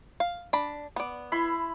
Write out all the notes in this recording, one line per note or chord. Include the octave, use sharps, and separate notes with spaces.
F5
D4 B5
B3 D5
E4 B5 C6